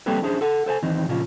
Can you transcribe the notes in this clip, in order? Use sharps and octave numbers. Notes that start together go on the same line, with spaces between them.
G3 A#3 C4 G4 A4 B4
C#4 D4 E4 G#4 C5
A4 F#5
A4 C5 F5 G#5
E2 D#3 E3 C4 D#4
A#2 C#3 F3 C#4 F4